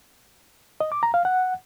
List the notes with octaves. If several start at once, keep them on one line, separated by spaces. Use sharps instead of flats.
D#5
D6
A#5
F5
F#5